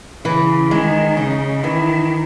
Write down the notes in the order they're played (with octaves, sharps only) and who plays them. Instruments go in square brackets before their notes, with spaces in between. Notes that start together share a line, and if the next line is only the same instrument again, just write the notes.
[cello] C#3 [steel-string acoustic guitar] E3
[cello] D#3 [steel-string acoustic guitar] G#3
[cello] C#3 [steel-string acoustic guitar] D#4
[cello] D#3 [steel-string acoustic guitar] E3